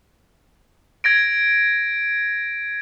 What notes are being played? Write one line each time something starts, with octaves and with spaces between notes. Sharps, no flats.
G#6 A#6 D7